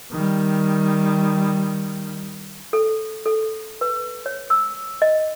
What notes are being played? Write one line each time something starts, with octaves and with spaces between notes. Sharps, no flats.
D#3 G3
A4
A4
B4
C#5
E6
D#5